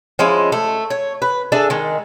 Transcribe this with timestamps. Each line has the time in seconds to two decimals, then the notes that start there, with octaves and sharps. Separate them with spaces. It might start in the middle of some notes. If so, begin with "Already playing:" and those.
0.19 F3 G#3 C#4 E4
0.52 A3
0.90 C#5
1.22 B4
1.52 D4 G#4 A4 E5
1.70 D#3 G#3